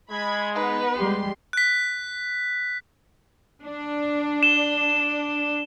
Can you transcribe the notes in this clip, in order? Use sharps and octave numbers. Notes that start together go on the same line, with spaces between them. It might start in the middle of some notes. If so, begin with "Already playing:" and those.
G#3 B5 G#6
B3 D#4 B4
G3 G#3 G4 C6
F#6 B6
D4
E7 G7